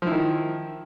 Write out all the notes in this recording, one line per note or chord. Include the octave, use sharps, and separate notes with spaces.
D#3 F3 E4